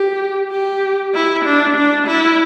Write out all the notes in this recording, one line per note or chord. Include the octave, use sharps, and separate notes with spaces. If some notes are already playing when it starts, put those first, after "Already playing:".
Already playing: G4
G4
E4
D4
D4
E4